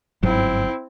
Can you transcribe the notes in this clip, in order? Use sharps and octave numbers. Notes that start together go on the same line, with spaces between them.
G1 G#2 F#3 C4 E4